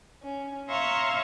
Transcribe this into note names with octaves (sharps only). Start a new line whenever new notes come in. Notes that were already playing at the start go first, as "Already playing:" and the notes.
C#4
C#5 E5 F5 A#5 C6 C#6